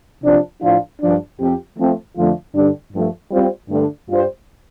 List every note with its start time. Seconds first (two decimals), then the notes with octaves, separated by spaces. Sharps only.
0.24 C3 F3 D4
0.62 A2 F3 D4 F4
1.01 G2 F3 D4
1.40 F2 F3 C4 G4
1.78 F3 A3 C4
2.16 F2 D3 F3 A3 F4
2.54 G2 D3 G3 D4
2.93 G2 F3 A3
3.31 G3 C4 F4 C5
3.70 G2 D3 A3 D4
4.09 G2 G3 F4 C5